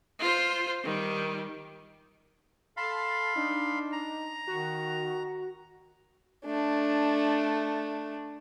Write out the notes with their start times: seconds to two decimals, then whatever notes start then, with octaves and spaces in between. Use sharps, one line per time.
0.19 F4 C5
0.84 D#3 G3
2.77 A4 F5 A5 B5 C6
3.36 D4 D#4
3.92 A#5
4.47 D#3 F#4
6.45 A3 D4